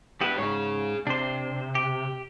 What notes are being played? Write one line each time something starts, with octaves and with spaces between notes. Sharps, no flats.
B3 E4 G4 B4
G#2 G#4 C#5
C3 D4 C5
G4